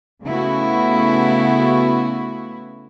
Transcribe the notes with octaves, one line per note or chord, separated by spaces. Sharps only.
C#3 A3 B3 E4 F#4